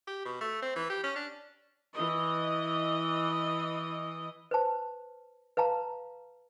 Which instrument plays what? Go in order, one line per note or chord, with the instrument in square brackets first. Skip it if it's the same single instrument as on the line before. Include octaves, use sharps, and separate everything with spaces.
[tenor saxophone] G4
B2
A3
C4
E3
G4
C#4
D4
[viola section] E3 D#5
[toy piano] B4 C5 A5
B4 F5 A5 A#5